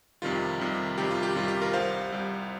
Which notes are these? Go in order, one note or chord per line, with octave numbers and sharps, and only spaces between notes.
F2 C3 D#3 G3 F4
F2 C3 D#3 G3
F2 C3 D#3 G3 G4
F4
G4
F2 C3 D#3 G3 F4
G4
F4 A#4
C2 C3 G3 C5 F5
C2 C3 G3